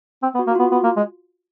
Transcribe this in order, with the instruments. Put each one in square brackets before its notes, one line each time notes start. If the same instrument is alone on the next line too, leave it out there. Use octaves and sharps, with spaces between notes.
[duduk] C4
B3
[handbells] F#4
[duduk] A#3
[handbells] F#4
[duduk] B3 [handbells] F4
[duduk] B3
A#3
G#3